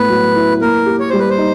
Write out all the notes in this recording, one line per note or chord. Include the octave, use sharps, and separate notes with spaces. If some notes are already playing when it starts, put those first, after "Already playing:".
Already playing: A2 B3 E4 B4
F#3
E4
A#3 A#4
G4
C#5
G3 C5
B4
C5
D#4